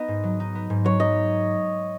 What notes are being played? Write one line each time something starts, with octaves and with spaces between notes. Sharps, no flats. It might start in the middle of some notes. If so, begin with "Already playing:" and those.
Already playing: B3 D#4 D#5
G#2
F#3
D#4
B3
G#2
F#3 C#5
D#4 D#5